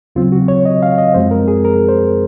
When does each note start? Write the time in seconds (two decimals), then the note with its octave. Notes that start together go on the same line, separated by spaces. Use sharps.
0.16 D#2 C#3 F#3 C4 F4
0.32 F#4
0.48 C#5
0.65 D#5
0.83 F5
0.98 D#5
1.14 F#2 F3 G#3 C4 C5
1.31 A#4
1.48 G#4
1.65 A#4
1.89 C5